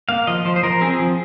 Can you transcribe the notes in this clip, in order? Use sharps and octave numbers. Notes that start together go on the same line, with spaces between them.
A#3 F5
F3 D#5
F3 C5
C5
F3 A#4
C4 G#4
F3